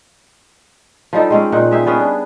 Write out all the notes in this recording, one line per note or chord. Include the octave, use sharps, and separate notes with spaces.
F3 G3 D#4 A4
G#3 C4 C#4
A#2 D#4 F#5
D#4 G4 G#4 E5
G3 B3 C#4 G#4
D4